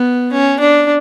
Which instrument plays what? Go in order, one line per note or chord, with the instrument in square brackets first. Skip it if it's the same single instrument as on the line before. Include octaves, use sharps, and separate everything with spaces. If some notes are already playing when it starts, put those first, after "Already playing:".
Already playing: [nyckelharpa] B3
C#4
D4